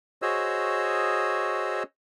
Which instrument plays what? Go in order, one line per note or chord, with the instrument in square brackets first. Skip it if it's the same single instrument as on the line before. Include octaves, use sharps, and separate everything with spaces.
[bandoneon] F#4 G#4 C5 C#5 D#5 E6